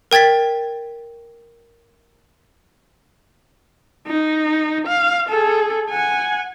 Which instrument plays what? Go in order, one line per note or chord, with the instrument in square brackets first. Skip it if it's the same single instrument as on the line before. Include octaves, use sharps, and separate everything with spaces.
[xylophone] A#4 G5 G#6 A6 B6
[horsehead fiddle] D#4
F5
G#4 A4
F#5 G#5